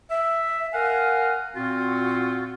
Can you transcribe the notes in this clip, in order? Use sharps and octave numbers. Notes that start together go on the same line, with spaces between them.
E5
A#4 F5 F#5 G#5
A#2 C4 F4 F#4